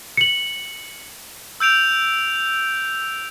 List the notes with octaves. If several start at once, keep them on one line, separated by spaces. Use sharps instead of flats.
C#7 F#7
E6 G6 D7 F7